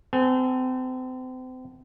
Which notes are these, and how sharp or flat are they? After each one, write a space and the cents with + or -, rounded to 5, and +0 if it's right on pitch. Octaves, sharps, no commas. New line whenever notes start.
C4 -35 A4 +0 G#5 +0